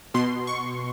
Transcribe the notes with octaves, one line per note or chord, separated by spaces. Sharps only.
B2 C6
C#6